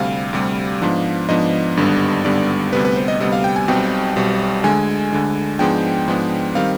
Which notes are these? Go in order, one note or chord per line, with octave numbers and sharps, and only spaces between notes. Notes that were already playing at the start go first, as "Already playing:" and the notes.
Already playing: D2 C3 G3 F5
D2 C3 G3
G#2 F3 B3 D4
G#2 F3 B3 D4 D#5
G#1 G2 D3 G3 B3
G#1 G2 D3 G3 B3 D5
D2 C3 G3 B3 B4
B4
C5
D#5
D2 C3 G3 B3 D#5
F5
G5
G#5
B1 B2 G3 C4 G5
B1 B2 G3 C4
D2 D3 G#3 G#5
D2 D3 G#3
G#2 F3 G#3 B3 D4 G5
G#2 F3 G#3 B3 D4
D#3 G3 C4 F5